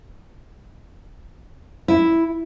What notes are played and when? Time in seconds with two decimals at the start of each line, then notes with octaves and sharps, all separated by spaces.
1.88 E4